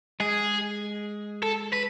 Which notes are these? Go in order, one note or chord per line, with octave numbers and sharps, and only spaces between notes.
G#3 G#4
A4
B4